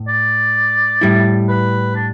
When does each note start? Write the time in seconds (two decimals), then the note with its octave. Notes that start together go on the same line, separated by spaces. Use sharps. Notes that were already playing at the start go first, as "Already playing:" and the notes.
Already playing: A2
0.08 D5
1.01 A2 G3 E4
1.49 B4
1.96 D4